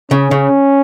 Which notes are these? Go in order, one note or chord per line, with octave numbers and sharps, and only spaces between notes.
C#3 C#4
C#3